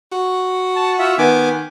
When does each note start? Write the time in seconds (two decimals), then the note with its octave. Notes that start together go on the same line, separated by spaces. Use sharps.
0.12 F#4
0.76 A5
0.99 F4 E5
1.18 D#3 B3 G#5 D6